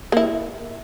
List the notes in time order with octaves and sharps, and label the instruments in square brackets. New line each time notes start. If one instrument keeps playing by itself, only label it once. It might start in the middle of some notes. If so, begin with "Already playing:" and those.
[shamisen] A#3 E4